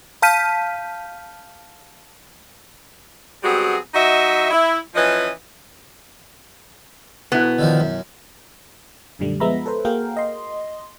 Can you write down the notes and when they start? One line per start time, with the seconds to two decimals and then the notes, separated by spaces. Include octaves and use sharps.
0.22 F5 A5 F6 G6 B6 D#7
3.43 F#3 G3 B3 C4 F#4 G#4
3.94 F#3 D#4 F#4 D#5 E5
4.51 E4
4.94 E3 F3 C#4 B4 D#5
7.32 B2 B3 E4
7.59 D3 D#3 F3
7.80 F#2
9.19 F#2 A#2 D3 G3 A3
9.40 F3 G#3 B3 E5 A#5 B5
9.66 A4 B4 C5
9.85 A#3 F#4 G#4 A#4 F5 G5
10.17 D#5 C6